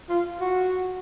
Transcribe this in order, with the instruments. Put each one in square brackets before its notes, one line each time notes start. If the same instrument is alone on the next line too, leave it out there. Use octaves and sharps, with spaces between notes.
[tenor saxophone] F4
F#4